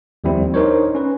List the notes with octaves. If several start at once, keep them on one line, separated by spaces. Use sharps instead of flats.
D#2 F3 G3 C4 E4
D4 D#4 A#4 C5 C#5
C#4 B4